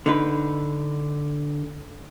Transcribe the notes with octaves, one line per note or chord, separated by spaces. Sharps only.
D3 D#4 B4